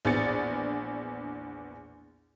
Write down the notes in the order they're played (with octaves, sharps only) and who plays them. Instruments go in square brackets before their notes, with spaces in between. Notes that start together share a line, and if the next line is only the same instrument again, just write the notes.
[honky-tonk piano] A#1 E2 B3 D4 A6 C#7